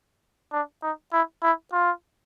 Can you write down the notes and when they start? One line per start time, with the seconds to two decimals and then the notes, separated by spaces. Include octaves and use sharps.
0.52 D4
0.82 D#4
1.12 E4
1.43 E4
1.72 F4